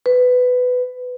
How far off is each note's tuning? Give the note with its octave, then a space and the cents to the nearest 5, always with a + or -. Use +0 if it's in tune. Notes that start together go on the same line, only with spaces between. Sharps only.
B4 +15